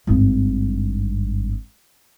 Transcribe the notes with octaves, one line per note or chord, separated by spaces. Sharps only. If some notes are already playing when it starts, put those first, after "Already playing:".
G#1 G2